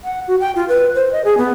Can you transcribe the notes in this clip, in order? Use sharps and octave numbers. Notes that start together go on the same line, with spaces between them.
F#5
F#4
G5
F4
B4
C5
D#5
G#4
B3